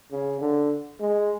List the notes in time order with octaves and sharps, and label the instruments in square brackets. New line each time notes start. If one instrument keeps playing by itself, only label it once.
[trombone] C#3
D3
G#3